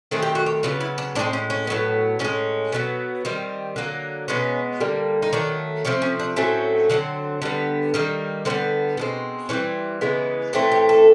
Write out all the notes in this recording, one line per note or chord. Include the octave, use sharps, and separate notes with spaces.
D#3 F#3 A3 C4 G#4
G4
F#4
G4
C#3 F#3 B3 F4
E4
D4
A2 F3 G#3 C4 D4
C#4
C#4
A2 F#3 B3
A2 F3 C#4
G#3
B2 F#3 B3
D#3 G3 C4
D3 F#3 A#3
B2 G#3 B3 C#4
D3 G3 A#3
D#4
D#3 F#3 A3 D4
C3 F3 A3 C4 C#4
C#4
D4
A2 F#3 A3 C4 C#4
D3 F#3 A3 C4
D3 G3 B3
D#3 G3 A#3
D3 G3 B3 C4
B2 G#3 C4
E3 G3 C4 C#4
C#3 E3 G#3 B3
A2 E3 A3 C4 D4
G4
A4